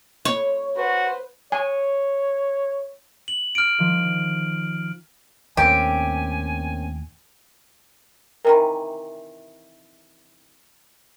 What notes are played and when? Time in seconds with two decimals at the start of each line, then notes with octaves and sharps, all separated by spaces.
0.25 C#5
0.77 F#4 B4 C5
1.52 C#5 G#5
3.28 F#7
3.55 F6 D7
3.79 D#3 F3
5.57 D#2 A2 A#3 C4 C#4 G4 G#5
8.45 C3 D#3 E3 A#4 B5